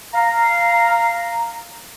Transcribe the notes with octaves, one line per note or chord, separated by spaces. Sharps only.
F5 A#5